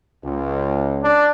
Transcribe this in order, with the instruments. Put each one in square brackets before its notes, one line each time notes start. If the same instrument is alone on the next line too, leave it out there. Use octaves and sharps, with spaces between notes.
[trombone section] C#2
[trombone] D4